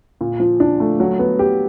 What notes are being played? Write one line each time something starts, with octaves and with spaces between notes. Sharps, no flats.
A#2
F3
D4
A3
F#3
B3
G4